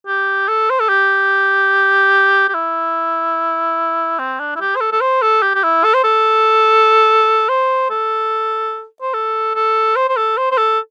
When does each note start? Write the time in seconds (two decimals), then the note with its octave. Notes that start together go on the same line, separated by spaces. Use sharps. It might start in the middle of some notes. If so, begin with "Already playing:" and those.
0.07 G4
0.48 A4
0.70 C5
0.80 A4
0.89 G4
2.48 G4
2.54 E4
4.19 C4
4.40 D4
4.56 E4
4.60 G4
4.76 C5
4.81 A4
4.92 A4
5.01 C5
5.22 A4
5.42 G4
5.55 G4
5.63 E4
5.84 A4
5.94 C5
6.04 A4
7.49 C5
7.90 A4
9.02 C5
9.14 A4
9.55 A4
9.96 C5
10.08 C5
10.17 A4
10.38 C5
10.51 C5
10.58 A4